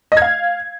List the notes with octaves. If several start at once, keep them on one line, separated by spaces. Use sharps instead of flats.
D#5
G#6
F5